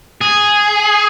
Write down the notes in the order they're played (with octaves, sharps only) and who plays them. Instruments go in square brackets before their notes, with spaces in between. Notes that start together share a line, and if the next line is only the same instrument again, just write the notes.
[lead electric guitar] G#4